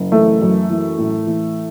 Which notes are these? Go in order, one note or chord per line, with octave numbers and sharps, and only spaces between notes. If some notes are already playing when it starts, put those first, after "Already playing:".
Already playing: F#1
E3 A3
F#2
E3
A2
E3